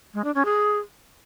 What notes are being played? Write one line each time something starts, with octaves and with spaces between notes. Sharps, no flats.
G#3
D4
C#4
G#4